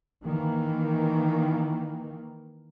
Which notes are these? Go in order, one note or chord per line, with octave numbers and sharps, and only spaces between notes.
D#3 E3 A#3